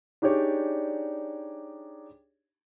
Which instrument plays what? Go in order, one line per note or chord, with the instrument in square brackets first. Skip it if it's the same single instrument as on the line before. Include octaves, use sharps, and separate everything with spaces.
[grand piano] D4 D#4 G4 G#4 C#5 D5